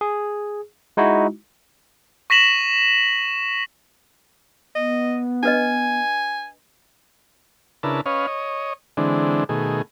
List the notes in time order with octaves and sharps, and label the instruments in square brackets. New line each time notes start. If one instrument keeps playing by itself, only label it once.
[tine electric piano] G#4
G#3 D#4 E4 F#4
[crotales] C#6 A#6 B6 E7 F#7
[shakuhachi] B3 [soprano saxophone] D#5
[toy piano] D4 B4 D#5 [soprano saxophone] G#5
[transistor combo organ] C#3 D4 E4 A#4 B4 A5
C#4 B4 C#5 D#5 F5
C#5 D#5
D3 E3 G#3 C4 D4
B2 D#3 A3 G#4